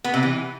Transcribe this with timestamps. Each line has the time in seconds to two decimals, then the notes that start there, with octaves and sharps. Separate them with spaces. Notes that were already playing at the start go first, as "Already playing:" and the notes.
0.04 B3
0.14 C3
0.23 E3